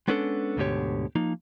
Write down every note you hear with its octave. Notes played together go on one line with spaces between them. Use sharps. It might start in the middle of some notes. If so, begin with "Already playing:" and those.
G#3 B3 C#4 D4 G#4 A4
D2 G#2 B2 D3 G4 C#5
F3 A#3 D#4